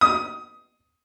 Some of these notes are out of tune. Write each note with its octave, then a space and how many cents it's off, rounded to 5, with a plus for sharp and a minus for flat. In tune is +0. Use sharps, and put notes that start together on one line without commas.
D#6 +15